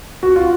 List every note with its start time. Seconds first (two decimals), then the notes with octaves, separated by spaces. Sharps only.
0.23 F#4
0.36 F4